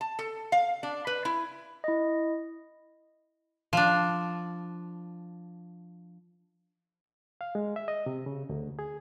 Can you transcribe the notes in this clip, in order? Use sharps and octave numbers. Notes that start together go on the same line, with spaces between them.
A5
A4
F5
D4
B4
E4
E4 D#5
F3 D4
F5
G#3
E5
D#5
C3
C#3
D2
G#4